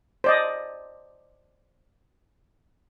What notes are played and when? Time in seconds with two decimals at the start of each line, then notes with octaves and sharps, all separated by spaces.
0.24 C5 D5 D#5